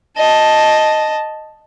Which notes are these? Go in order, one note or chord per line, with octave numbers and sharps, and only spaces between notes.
D#5 A5